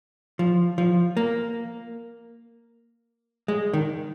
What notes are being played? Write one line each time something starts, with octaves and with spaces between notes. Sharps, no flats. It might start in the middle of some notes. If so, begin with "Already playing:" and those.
F3
F3
A#3
G#3
D#3